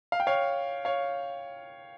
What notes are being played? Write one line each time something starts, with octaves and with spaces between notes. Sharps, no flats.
F5
G5
C#5 F5
C#5 F5